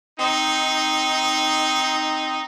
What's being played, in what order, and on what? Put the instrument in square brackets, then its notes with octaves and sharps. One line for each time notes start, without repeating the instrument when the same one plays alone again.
[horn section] C4 D#4